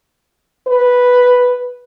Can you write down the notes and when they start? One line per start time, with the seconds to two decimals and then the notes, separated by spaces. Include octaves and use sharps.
0.67 B4